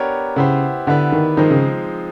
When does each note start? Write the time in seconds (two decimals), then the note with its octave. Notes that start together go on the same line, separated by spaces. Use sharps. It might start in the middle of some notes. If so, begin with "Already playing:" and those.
Already playing: B3 D4 G4 A#4 C#5
0.36 C#3 B3 E4 G4 C5
0.87 D3 B3 E4 G4 B4 D5
1.12 D#3
1.37 D#3 F3 G#3 C4 D#4
1.50 C#3